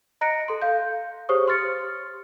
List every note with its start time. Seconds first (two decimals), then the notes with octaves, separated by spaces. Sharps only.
0.21 D#5 A#5 F#6 A#6 C#7 D7
0.48 A4 C6
0.62 F5 G6
1.29 G4 G#4 C5 C#5 C#6 D#6
1.47 G4 C6 F6 A6 C#7